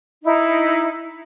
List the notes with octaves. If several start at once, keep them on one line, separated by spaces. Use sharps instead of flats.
D#4 E4